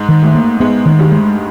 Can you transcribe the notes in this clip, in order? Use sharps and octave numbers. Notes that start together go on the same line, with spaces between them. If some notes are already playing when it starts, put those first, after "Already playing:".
Already playing: G#2 G#3
D#3
A2 A3
A#3
G#2 G#3 B3
D#3
G2 G3
G#3